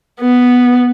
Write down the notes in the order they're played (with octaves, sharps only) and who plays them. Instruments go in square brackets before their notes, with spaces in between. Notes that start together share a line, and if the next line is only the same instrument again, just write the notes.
[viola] B3